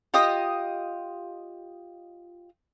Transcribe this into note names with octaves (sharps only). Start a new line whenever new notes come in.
F4 G4 D#5 D#6